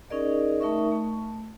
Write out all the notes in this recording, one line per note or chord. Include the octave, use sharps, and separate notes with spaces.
C#4 D#4 G#4 A#4 D5 D#5
A3 D#4 A#4 E5 C#6
A3